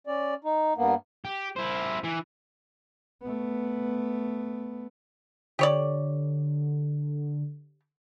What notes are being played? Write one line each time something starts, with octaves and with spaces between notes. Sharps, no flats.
C#4 D5
D#4
G2 A#3 B3
G4
E4 C5
E3
A3 B3
D3 G4 C#5 D5